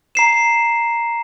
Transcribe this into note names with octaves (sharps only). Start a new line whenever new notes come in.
A#5 C7 E7